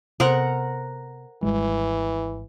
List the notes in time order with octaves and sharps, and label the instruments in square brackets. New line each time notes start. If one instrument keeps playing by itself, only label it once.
[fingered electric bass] C3 B3 [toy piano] A4 C5 C6 [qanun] A#4 F#5
[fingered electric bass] G#1 G3 G#3 [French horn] E3